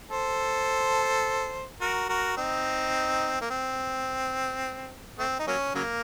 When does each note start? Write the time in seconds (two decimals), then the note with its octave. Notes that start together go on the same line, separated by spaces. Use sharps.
0.11 A4 C5
1.81 F#4 A#4
2.09 F#4 A#4
2.37 C4 D#4
3.41 A#3
3.50 C4
5.18 A3 C4
5.39 D#4
5.47 F#3 A#3 C#4
5.75 C#3 F#3 A#3